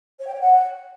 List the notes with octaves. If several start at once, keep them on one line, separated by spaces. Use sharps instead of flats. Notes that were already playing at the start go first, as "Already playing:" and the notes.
C#5
G5
C#5
F#5